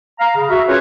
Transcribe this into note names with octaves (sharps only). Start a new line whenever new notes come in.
F5 A#5
C#3
F#4 E5
C#4 F4 G#4 A#4 B4 C#5